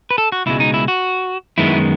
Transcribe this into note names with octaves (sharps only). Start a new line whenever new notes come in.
B4
A4
F#4
C#2 B2 G#3 E4
D#4
E4
F#4
F#2 D#3 G#3 B3 E4